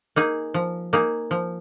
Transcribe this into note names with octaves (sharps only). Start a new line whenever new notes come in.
A#3 D#4 G#4
F3
A#3 D#4 G#4
F3